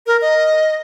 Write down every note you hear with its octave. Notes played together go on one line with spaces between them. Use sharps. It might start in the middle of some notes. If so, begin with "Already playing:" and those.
A#4
D#5